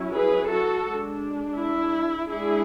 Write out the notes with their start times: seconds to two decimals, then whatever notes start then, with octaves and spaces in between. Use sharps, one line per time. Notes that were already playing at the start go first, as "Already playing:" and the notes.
Already playing: F#3 C#4 E4
0.13 G#4 B4
0.49 F#4 A4
0.85 G#3 D4
1.57 E4
2.28 G#3 D4 E4 G#4